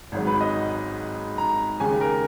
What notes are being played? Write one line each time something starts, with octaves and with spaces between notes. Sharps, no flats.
G#1 G#2 F#3
B4
D#5
A#5
D#2 C#3 G#3 G#5
A#4